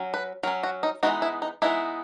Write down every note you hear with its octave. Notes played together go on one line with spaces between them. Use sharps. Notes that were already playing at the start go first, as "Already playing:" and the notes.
Already playing: F#3 C#4
B4
F#3 C#4 A#4
F#4
D#4
E3 G#3 B3 D#4 F#4
E4
D#4
E3 G#3 B3 D#4 E4